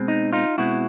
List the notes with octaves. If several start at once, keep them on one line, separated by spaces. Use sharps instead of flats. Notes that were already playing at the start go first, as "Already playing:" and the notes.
Already playing: B2 G#3 C4
D#4
D#4 F4
B2 G#3 C4 E4 F#4